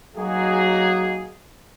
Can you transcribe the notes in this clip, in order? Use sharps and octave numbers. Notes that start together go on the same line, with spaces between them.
F#3 G#3 A#3 D#4 F#4 G#4